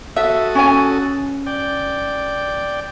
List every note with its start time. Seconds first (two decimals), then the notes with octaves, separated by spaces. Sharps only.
0.16 F#4 A4 E5 D#6
0.55 C#4 G#5
1.46 D5 G5